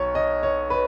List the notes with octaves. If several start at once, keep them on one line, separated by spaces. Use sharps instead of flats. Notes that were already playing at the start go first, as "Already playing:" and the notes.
Already playing: B1 C#5
D#5
C#5
B4